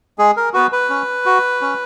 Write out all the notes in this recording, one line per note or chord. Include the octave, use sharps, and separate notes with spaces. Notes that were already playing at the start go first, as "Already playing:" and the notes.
G#3 G#4
A#4
B3 F#4 B4
B4
C#4
F#4
C#4